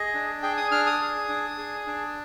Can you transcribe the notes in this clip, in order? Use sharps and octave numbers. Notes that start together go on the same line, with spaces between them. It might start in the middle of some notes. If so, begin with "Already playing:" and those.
Already playing: G#4 D#5
D4
G#4 G5
D#6
D4 F6
D#6
G#4
D4
G#4
D4